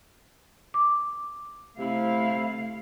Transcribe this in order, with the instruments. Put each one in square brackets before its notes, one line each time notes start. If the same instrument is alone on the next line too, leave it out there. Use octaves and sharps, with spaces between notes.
[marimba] D6
[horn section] C3 E4 [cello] A3 F5